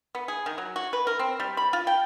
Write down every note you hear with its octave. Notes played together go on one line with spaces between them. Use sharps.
B3
G#4
D#3
F#3
F#4
B4
A#4
C4
G3
B5
F4
G5